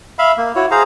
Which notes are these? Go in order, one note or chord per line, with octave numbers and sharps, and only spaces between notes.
E5 F5 B5
A#3
E4 F#4 C#5
G#4 C5 F5 A#5